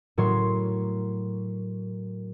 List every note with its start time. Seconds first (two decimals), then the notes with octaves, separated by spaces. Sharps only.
0.17 A2 F#3 A#4 C#5 C6